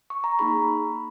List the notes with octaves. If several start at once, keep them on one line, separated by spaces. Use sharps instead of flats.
C#6
A#5
A#3 D#4 G#4 B5